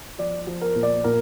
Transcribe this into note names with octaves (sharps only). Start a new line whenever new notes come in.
F3 D5
F3
A#4
A#2
D5
A#2 A#4